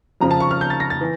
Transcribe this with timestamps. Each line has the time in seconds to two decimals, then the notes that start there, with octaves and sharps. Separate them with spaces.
0.21 F2 C#3 F3 A#5
0.31 A5
0.40 C#6
0.51 F6
0.61 G6
0.70 A6
0.80 A#6
0.90 A6
1.01 E3